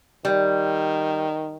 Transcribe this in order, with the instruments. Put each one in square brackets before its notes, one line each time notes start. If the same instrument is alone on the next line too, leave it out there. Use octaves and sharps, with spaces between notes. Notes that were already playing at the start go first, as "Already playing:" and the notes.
[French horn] D#3 [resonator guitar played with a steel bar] G3